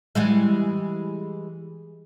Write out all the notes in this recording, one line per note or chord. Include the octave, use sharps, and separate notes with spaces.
E3 G3 G#3